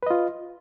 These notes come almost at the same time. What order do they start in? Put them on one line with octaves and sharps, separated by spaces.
B4 D#5 F4